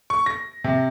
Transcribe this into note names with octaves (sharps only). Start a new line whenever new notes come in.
C#6
A#6
C3